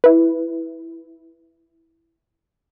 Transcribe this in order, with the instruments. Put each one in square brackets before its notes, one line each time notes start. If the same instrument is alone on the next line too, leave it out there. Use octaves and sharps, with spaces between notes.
[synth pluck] E4 B4